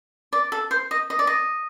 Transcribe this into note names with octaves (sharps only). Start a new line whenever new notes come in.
D5
A4
C5
D#5
D#5
D5
D#5